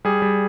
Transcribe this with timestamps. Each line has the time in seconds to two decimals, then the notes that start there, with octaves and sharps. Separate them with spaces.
0.05 G3 G#4
0.22 G3